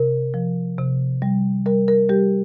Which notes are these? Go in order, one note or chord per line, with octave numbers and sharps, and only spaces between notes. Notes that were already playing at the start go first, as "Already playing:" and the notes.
Already playing: C3 A#4
F3
C3
G3
G3 A#4
A#4
G3 G4